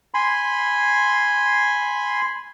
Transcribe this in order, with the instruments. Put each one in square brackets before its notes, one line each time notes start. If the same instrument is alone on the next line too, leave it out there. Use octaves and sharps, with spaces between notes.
[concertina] G#5 B5 C6